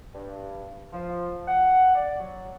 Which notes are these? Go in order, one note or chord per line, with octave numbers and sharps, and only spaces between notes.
G2
F3
F#5
D5
F#3